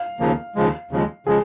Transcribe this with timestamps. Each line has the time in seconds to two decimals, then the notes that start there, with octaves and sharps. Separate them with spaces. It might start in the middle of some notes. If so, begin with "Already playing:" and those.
Already playing: F5
0.20 D#2 C#3 F3 A#3
0.56 D#2 C#3 F3 G#3
0.91 D#2 C#3 F3 G#3
1.27 C#3 F3 G#3 G#4